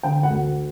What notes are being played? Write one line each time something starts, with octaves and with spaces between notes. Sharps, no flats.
D3 G5
F#5
D2